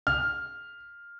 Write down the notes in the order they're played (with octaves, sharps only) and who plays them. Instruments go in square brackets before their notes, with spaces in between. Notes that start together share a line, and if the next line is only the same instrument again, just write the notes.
[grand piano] F6